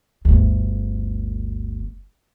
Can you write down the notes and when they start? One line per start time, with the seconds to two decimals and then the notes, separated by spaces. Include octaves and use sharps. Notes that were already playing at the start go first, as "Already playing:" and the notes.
0.25 G1 D2